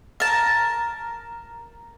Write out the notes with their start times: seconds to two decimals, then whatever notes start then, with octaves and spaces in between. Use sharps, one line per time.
0.20 A#4 A5